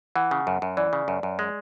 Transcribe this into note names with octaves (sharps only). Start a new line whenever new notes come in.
E3 F#5
C#3
F#2
F#2
E3 D5
C#3
F#2
F#2
G#3